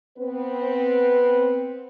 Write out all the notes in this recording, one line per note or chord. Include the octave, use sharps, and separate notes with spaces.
B3 C4 B4